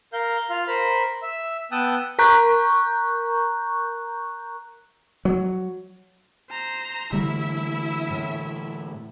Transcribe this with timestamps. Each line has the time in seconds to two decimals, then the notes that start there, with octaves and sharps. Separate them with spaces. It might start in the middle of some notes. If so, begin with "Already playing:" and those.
0.13 A#4 F5 G6
0.50 F4 F5 F6
0.68 A#4 C5 B5
1.22 E5
1.72 B3 G5 A5 D#6 E6 F#6
2.19 A#4 A#5 C#6 F#6 G6
5.25 F#3
6.50 C5 A#5
7.13 D3 E3 G3 A3 E4 E5
8.10 A2